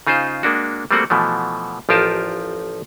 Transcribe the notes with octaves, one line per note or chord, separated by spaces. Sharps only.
C#3 D#4 F4 G#4 C5
G#3 A#3 D4 F#4
G3 A3 A#3 C4 F#4 F#5
B2 E3 F3 A3
A1 F3 F4 G4 A#4 A5